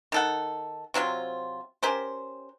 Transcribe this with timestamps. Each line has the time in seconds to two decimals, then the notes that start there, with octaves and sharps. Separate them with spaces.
0.12 D#3 A4 F#5
0.94 C3 F#3 C4 F4
1.83 C#4 G4 A#4 C5